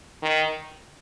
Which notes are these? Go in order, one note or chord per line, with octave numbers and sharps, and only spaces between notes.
D#3